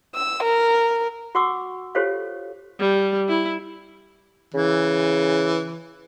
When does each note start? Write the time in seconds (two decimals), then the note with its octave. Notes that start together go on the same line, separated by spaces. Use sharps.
0.15 E6
0.43 A#4
1.35 F#4 F#5 C#6 D6 E6
1.95 F4 G4 A4 C5 C#5 F5
2.79 G3
3.28 E4
4.54 C#3 E3